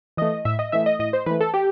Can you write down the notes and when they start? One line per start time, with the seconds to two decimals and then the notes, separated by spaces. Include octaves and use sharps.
0.17 E3 A3 D#5
0.45 A2 E5
0.59 D#5
0.72 E3 A3 E5
0.86 D#5
0.99 A2 D#5
1.13 C5
1.26 E3 A3 B4
1.40 A4
1.54 G4